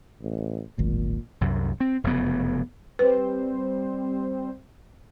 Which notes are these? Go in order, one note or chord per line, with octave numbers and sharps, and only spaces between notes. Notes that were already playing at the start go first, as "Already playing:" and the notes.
A1
D1 G#1 A#2
C2 F#2
C4
F1 F#2 C#3 B3
G3 C4 B4 C5